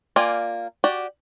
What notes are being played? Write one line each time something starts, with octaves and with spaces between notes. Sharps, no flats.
A#3 F4 D5 G5 G#5
F#4 G4 D5